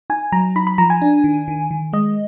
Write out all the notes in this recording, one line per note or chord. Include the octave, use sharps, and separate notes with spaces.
D#4 G#5
F#3 A#5
D#4 B5
B5
F3 A#5
G#5
D4
D#3
D#3
D#3
G#3 D#5